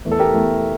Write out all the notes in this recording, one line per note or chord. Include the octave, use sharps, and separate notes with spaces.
E2 E3 A3
A4
G4 A#4
E2 E3 A3